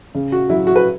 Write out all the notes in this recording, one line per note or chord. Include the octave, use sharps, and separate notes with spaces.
C#3
F#4
F#3 E4
F#4
B4